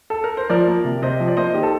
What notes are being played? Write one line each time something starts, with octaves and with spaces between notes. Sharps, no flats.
A4
A#4
C5
F3 A#4 D5
A#3
C3
C3 C5 D#5
F3
D5
A#3 C5 D#5
D#3 G4
A4